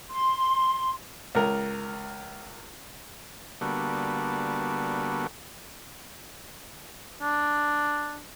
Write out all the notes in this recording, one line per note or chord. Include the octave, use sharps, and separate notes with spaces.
C6
C#2 A#4
D3 G3 A#3 B3 F#4 A4
D4